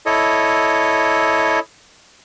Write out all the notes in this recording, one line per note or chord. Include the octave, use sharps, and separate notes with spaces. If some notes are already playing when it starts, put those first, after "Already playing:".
E4 A4 C#5 D#5